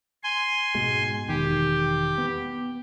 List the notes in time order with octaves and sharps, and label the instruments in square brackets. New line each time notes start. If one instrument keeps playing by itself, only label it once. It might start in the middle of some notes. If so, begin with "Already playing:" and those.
[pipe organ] G#5 C6
[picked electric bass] G#2 B2 G#3
[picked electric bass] E1 D#3 [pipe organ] G4
[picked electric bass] B3